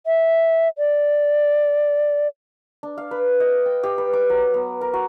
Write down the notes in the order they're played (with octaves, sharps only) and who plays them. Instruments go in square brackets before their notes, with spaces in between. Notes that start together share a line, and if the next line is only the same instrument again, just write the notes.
[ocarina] E5
D5
[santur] D4
F5
B4
D#5
G5
G4
B4
D6
F#3
B3
A#4
F#4